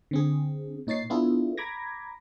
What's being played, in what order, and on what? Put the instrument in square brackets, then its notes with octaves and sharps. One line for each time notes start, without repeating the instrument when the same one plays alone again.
[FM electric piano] D3 C4 G#4
A#2 D#4 C#5 A6 C7
B3 D4 E4 F4 G#4 A4
A#5 B5 D6 G#6 A#6